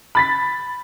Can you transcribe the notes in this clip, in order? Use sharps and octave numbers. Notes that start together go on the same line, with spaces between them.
B5 A6 B6